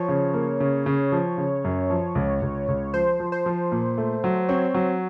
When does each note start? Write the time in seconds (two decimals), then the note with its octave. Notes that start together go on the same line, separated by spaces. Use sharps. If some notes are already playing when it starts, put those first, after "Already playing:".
Already playing: F3 C#5
0.09 C#3
0.34 A#3
0.60 C#3
0.86 C#3
1.12 F3
1.38 C#3
1.65 F#2
1.90 F3
2.15 C#2
2.42 C#2
2.68 C#2
2.94 F3 C5
3.20 F3
3.32 C5
3.46 F3
3.72 A#2
3.98 A3
4.24 F#3
4.49 C4 C#5
4.74 F#3